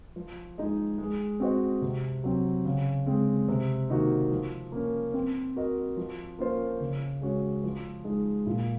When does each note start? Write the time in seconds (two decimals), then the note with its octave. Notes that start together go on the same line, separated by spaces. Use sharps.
0.16 F3
0.58 G#3 D#4 G#4 D#5
0.98 G#3
1.40 C4 F#4 C5 D#5
1.82 C3
2.24 F#3 C4
2.65 C#3
3.06 G#3 C4
3.48 C3
3.89 D#3 A#3 D#4 F#4
4.31 F3
4.72 A#3 C#4
5.14 C4
5.56 F#4 A#4 D#5
5.97 F3
6.38 A#3 C#4 F4 C5
6.80 C#3
7.21 G#3 C#4 F#4 C#5
7.64 F3
8.04 G#3 D#4
8.47 A#2